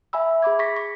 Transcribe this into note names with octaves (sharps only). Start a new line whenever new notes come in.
E5 G#5 B5 E6
G#4 B5 D6 G#6
C#6 A#6 B6
C#6